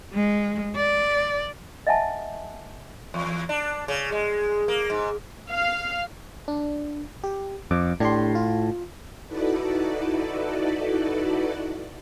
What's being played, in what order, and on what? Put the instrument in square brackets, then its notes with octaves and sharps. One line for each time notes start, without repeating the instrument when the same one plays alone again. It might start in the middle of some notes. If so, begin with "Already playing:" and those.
[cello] G#3
D5
[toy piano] D#5 E5 F#5 G#5 A5
[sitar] E2
D4
C#3
G#3
A#3
G#2
[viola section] F5
[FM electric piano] D4
G4
[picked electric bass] F2 [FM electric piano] D6
[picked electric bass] A2 [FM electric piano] D4 G4 C6
[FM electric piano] F4
[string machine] D#4 E4 F#4 A4 B4 D5